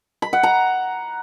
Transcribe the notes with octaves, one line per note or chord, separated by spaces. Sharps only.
B5
F#5
A#5